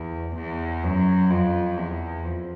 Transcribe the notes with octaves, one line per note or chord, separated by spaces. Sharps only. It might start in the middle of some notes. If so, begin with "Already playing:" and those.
Already playing: E2
E2
F#2
F2
E2
F2